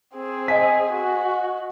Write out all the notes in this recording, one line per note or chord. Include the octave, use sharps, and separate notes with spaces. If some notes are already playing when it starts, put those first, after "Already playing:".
C4 G#4
D#5 G#5 B6
F#4